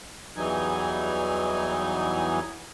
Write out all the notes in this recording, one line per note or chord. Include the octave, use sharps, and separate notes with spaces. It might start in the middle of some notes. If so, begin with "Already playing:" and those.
E2 E3 F#3 G3 D#4 G#5